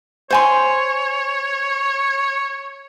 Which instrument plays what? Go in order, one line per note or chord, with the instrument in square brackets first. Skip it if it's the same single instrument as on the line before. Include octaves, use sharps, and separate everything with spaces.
[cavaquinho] C5 G#5 C6 [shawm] C#5